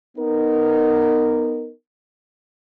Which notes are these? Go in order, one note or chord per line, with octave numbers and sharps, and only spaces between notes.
B3 D#4 A#4